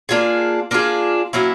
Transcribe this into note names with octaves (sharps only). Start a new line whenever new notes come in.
A#3 D4 F4 G#4
A#3 D4 F4 G#4
F#3 A#3 C#4 E4